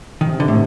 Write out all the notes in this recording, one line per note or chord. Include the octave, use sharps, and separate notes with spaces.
C3 D#3
D3
A2